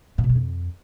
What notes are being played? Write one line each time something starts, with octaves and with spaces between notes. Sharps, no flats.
A2
B2
G#3
F2